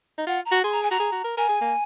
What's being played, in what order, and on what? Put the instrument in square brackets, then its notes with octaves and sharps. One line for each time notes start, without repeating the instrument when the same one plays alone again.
[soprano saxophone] D#4
[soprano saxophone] F4 [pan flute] F#5
[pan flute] A#5
[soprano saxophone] F#4
[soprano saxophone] G#4 [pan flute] C6
[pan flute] A#5
G#5
[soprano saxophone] F#4 [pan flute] A#5
[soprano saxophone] G#4
F#4
A#4
[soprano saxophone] A#4 [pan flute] G#5
[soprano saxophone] G#4
A#3